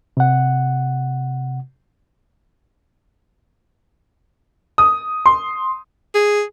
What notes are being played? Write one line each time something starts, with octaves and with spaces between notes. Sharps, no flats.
C3 F#5
D#6
C6
G#4